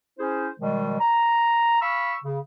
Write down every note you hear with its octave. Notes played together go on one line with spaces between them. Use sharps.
C#4 E4 G#4 C5
B2 D#3 F3 G3 G#3
A#5
F5 B5 C#6 E6
C#3